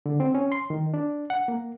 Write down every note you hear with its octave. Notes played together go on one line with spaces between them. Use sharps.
D3
C4
C#4
C6
D#3
D4
F#5
A#3